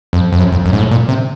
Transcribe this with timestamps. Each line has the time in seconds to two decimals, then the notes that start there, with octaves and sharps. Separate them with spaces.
0.13 F2
0.32 F2
0.39 F#2
0.52 F2
0.66 F#2
0.73 G#2
0.79 A2
0.91 A#2
1.09 C3